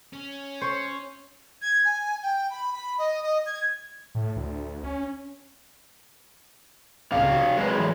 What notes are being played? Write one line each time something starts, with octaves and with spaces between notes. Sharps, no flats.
C#4
C5 C#5 C#6
G#6
G#5
G5
B5
B5
D#5
D#5
G#6
A2
D2
C#4
D#1 C#2 C3 F5 D6
G3 F#4
F#3 G#3 G#4 A#4 B4
A2 E3